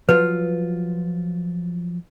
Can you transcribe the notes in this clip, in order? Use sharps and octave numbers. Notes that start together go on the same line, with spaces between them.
F3 F#3 F4 B4